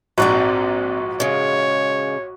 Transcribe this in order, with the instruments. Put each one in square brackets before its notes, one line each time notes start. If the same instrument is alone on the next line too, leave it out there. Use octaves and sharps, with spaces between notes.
[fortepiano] A#1 G#2 [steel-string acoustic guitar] C4 D5 A#5 [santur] F#4
[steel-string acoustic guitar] C#3 G#3 [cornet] C#5